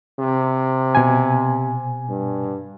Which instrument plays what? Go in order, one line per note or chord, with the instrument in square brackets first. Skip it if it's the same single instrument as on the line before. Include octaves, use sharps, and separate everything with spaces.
[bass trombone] C3
[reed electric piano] B2 G#5
[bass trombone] G2